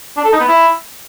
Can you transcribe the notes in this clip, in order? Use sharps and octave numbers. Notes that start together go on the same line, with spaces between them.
D4
A4
D#4
B3
E4